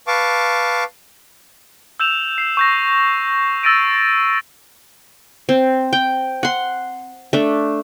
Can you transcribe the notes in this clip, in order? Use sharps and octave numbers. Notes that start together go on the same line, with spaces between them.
B4 F5 A5 C#6 D6
E6 G6 E7 F7
C7
C#6 G6 A#6
E6 A6 A#6 D7 D#7
C4
G5
F#5 C6
A3 D4